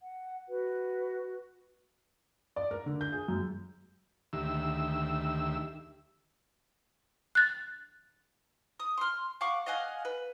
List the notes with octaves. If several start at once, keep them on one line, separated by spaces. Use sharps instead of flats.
F#5
F#4 B4
D5
A#4
D3
G6
G#4
F#2
D2 D#3 G4 E5 E6
F#6 A6
D#6
C6 F6
F5 F#5 C#6 D6
D#5 F5 F#5 G#5
B4